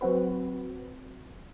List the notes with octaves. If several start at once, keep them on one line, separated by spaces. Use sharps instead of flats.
F#3 C4 F#4 B4